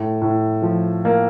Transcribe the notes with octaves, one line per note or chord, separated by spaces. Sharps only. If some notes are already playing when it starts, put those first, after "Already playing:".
Already playing: A2
A2
F3
A#3